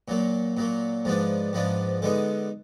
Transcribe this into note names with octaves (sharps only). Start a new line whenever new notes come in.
A#2 F#3 A#3
A#2 F#3 A#3
G#2 F3 B3 D4
G#2 F3 B3 D4
D3 G#3 B3 D#4